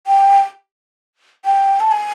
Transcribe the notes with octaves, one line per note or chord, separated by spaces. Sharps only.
G5
G5
A5
G#5